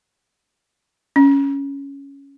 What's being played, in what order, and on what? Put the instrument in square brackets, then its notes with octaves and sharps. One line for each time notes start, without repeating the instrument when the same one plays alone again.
[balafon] C#4